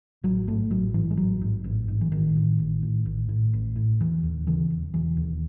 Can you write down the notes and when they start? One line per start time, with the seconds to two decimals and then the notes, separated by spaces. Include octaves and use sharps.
0.24 A1 F#3
0.47 G#2 A3
0.70 A1 F#3
0.94 G#2 E3
1.11 G#3
1.17 A1 F#3
1.41 G#2
1.64 A1
1.88 G#2
2.01 E3
2.12 A1 D#3
2.36 A2
2.59 A1
2.83 A2
3.06 A1
3.29 A2
3.53 A1
3.76 A2
4.00 E1 E3
4.23 D#2
4.47 C#3 E3
4.70 E1
4.94 E1 E3
5.17 D#2